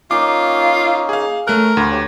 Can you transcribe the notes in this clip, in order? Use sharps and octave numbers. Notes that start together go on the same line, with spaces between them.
A#3 C#4 D#4 F4 D6
G#4 F5
A3 C#4 A#4 F#6
D2 B4 F5 C6
A#3 G4 C#5